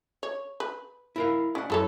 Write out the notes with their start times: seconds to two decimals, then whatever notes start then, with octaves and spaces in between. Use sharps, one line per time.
0.23 C#5
0.60 B4
1.16 E4 A#4 F5
1.55 C#4 D5 F#5
1.70 F#2 E4 A4 C#5